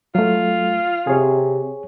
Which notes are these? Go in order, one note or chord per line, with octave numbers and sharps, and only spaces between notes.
F#3 A3 F4
C3 G#4 C#5